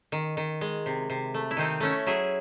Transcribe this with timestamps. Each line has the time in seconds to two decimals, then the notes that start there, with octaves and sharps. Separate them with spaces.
0.12 D#3
0.37 D#3
0.61 G#3
0.86 C3
1.10 C3
1.34 A3
1.51 E4
1.57 D#3 C4 D#4
1.80 A3 C#4 E4
2.07 F#3 E4 G#4